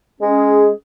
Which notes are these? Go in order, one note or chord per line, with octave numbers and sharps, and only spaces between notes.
G#3 C#4 G#4